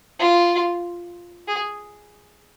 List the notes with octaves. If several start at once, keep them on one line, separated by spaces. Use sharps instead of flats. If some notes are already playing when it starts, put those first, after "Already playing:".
F4
G#4